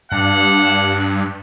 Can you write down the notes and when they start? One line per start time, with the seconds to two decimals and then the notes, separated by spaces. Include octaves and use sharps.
0.12 G2 D4 F5 F#5